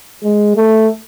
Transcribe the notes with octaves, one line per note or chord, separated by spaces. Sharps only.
G#3
A3